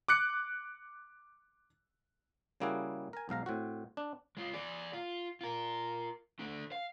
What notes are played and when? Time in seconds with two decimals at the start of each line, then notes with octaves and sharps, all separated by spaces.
0.08 D6 F#6 C#7
2.60 C#3 G3 A#3 E4 F#4 G#4
3.13 A#4 G#5
3.29 B1 G#2 F5 A#5
3.46 A2 C4 F#4
3.97 D4
4.37 G#3 F4
4.54 G#4 D5
4.93 F4
5.41 F4 A#4
6.39 A3 D4
6.72 F5